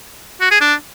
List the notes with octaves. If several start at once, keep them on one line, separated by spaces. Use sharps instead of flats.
F#4
G#4
D4